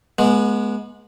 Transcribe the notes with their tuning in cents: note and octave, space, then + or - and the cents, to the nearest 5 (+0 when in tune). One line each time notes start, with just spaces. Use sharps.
G#3 +20 B3 -25